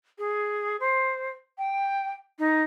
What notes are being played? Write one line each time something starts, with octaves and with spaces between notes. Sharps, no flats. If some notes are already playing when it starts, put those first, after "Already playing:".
G#4
C5
G5
D#4